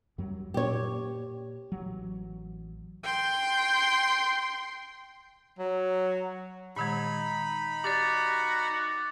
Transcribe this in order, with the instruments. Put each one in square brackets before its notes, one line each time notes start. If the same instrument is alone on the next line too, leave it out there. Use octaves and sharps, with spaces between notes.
[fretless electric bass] F#2 F#3 G3
[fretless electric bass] A#2 [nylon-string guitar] G4 C#5
[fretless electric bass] A1 F#3
[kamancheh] G5 C6
[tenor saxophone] F#3
[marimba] A#2 D#3 G#3 [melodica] D#4 B5
[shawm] F#4 [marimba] G4 D5 [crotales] D6 A6